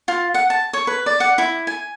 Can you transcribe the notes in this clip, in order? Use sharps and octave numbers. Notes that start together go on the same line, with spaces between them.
F4
F#5
A5
C#5
B4
D5
F#5
E4
G#5